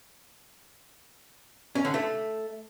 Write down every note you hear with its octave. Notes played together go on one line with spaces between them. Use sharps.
C#4
D3
A3